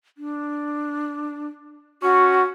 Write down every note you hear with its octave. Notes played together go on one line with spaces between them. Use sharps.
D4
C#4 F#4